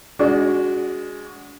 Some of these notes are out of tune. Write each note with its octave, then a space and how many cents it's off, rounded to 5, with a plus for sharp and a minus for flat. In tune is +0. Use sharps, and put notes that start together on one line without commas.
G#3 +0 D4 -35 F#4 +0